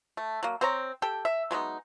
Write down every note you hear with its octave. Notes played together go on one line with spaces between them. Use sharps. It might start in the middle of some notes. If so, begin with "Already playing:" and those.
A3
F#3 A#3
C4 C5 C#5 A#5
G4 A4 G5
E5
F#3 G#3 B3 D#4